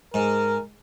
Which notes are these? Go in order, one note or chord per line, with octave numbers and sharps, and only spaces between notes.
G#2 A#4